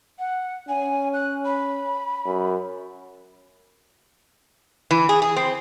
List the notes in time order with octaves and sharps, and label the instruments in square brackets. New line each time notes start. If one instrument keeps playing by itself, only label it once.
[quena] F#5
[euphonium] C#4 [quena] G#5
[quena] F#6
B5
[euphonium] F#2
[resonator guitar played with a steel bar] E3
G#4
G#4
C4